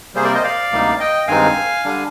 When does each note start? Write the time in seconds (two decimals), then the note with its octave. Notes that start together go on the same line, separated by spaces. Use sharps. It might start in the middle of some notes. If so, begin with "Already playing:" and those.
0.15 C3 G3 A#3 G#4 C5
0.24 A#4 D5
0.35 C5 D#5
0.43 D5 F5
0.72 D2 C3 G3 A#3 D#4
1.00 D#5 G5
1.27 G2 D#3 G#3 C4 D#4 F5 G#5
1.85 D3 G3 D4